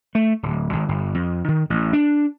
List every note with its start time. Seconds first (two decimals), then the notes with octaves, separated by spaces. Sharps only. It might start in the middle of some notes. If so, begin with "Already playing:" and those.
0.15 A3
0.43 D1
0.73 G#1
0.89 G1
1.14 F2
1.48 D#3
1.70 A1
1.93 D4